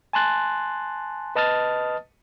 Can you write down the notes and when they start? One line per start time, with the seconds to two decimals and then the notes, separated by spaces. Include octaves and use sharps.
0.13 G#5 A5 C6 F#6 A6
1.36 B4 D#5 A5 D#6 F6 A6